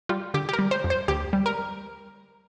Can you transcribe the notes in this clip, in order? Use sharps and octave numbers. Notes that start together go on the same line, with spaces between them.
G3 F4
D3 G4
G4
A#4
G3
C5
F2
C5
D2 G4
G3
A#4